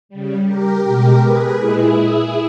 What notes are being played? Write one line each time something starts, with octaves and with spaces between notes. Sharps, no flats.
C#3 G3
G4 A#4
B2 G#3 G4 A#4
G#4 B4
A#2 G#3 E4 G#4